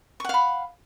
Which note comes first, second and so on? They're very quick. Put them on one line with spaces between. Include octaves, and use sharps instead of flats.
C#6 F#5 F5 B5